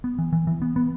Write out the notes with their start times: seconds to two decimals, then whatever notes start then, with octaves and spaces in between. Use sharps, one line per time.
0.04 B3
0.18 E3
0.33 E3
0.47 E3
0.62 B3
0.76 B3